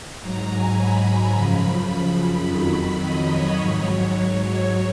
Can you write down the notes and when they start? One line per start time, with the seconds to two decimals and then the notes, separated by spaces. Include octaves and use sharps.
0.22 G#2 F#3 A#5
0.49 G#5
0.78 B5
1.34 F#2 C#3 F3
1.89 B5
2.46 F2 D#3 F#3
3.02 D#5
3.30 C#5
3.58 G#2 F#3 C#5